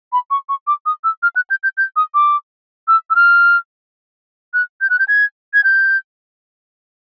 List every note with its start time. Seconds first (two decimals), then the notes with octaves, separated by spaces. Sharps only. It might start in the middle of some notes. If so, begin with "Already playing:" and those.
0.12 B5
0.30 C#6
0.49 C#6
0.67 D6
0.86 D#6
1.04 E6
1.23 F6
1.36 F#6
1.50 G6
1.63 G6
1.77 G6
1.96 D#6
2.14 D6
2.88 E6
3.10 E6
3.15 F6
4.54 F#6
4.81 G6
4.90 F#6
4.99 G6
5.08 G#6
5.54 G#6
5.64 G6